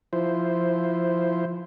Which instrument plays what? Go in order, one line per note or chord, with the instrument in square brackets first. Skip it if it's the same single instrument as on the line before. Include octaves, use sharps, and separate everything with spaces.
[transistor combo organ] F3 E4 C5